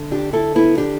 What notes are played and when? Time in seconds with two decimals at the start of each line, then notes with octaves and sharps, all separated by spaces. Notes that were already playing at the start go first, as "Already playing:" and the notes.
Already playing: D2 D3
0.11 D4 G4
0.33 E4 A4
0.55 B3 E4
0.78 D4 G4